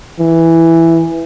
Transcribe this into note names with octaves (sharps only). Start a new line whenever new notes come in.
E3